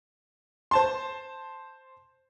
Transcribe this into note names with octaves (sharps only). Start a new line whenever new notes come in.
C5 A5 C6